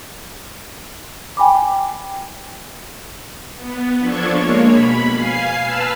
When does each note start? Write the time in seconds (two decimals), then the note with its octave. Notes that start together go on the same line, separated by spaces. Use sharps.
1.37 G5 G#5 B5 D6
3.55 B3
3.98 F3 D4 A4 C#6 G#6
4.29 G#3 A#3 C#5
4.70 B2 B5
5.11 F5 G#5 C7
5.60 B4 A5 E6 F6